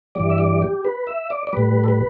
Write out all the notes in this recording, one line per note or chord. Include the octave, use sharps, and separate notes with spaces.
G2 E3 G3 D5
E5
D5
G4
B4
E5
D5
D5
A2 G3 B4
A4
B4